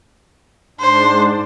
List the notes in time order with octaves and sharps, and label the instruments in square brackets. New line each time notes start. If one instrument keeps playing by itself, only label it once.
[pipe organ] G#2 D4 [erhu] C5